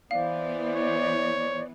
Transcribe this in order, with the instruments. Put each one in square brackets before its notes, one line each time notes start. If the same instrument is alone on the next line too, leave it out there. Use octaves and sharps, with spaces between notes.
[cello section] E3 B3 [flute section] C5 D5 [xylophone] F5
[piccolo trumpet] C#5